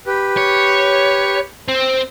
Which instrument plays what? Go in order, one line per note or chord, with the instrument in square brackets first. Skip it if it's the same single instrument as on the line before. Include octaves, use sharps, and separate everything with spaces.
[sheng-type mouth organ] G4 B4
[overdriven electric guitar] C#5
C4